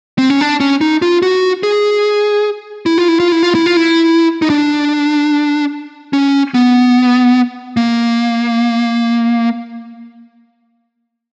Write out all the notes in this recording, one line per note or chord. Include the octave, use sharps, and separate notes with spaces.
C4
C#4
D4
C#4
D#4
F4
F#4
G#4
E4
F4
E4
F4
E4
F4
E4
F4
E4
D#4
D4
C#4
B3
A#3